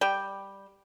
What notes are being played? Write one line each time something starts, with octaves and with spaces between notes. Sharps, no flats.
G3 G5